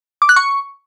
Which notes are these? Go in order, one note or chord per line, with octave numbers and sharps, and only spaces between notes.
D6
F#6
C#6